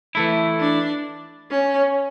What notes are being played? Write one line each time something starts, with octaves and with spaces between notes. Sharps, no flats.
E3 A3 E4
D4
C#4